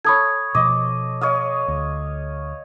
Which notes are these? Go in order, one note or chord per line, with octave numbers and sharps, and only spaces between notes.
A4 C#5 B5 D#6 G#6
B2 F3 D#5 D6
C#5 D#5 F5
D2